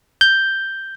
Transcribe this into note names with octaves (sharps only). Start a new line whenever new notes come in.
G6